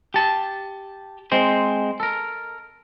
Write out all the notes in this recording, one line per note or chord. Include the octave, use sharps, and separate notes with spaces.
G4 A5
G#3 C4 C5
A4 A#4